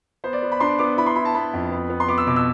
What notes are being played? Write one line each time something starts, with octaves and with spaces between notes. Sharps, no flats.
B3 C5
D5
B3
B5
D4 C6
B3 D6
E4 B5
C6
E4 B5
A5
B3 B5
F2
B3
B3
C6
B3 D6
E6
B2 D6
E6